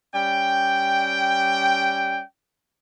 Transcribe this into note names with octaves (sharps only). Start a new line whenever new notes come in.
G3 C#4 D5 G5